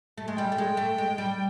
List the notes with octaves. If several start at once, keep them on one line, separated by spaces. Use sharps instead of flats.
A3
G#3
G3 G5
A3
G#3
A3
G#3
G3